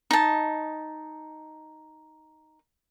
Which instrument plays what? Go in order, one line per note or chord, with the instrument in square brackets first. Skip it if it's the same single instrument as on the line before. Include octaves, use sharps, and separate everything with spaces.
[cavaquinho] D#4 A5